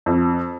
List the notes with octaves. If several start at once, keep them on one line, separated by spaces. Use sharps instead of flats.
F2